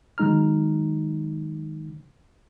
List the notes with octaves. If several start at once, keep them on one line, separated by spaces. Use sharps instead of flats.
D#3 F#3 G#3 D#4 A#5 F6